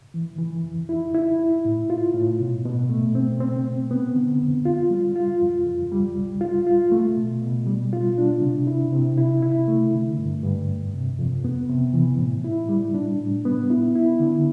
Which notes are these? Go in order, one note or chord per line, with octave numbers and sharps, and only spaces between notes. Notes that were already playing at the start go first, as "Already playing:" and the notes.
E3
E3
F2
E4
E4
E4
A2
F4
A2
B2
B2
A3
C4
C4
C4
B3
D3
F2
F4
G3
F4
F2
F2
G3
C2
F4
F4
A3
B2
B2
G3
F4
D4
C3
E4
C3
E4
E4
A3
D3
G2
G2
F2
C3
F2
B3
C3
E3
A2
E4
G3
D4
A2
B3
E4
E4
D3